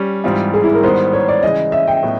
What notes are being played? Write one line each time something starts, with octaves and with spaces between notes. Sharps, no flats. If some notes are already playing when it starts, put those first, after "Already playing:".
Already playing: G3 C#4 G4
G#2 E3 G3 C4 F4
G#4
E4
A#4
G#2 D#3 G3 B3 C5
C#5
D5
C#3 E3 G#3 D#5
E5
G5
A2 F#3 B3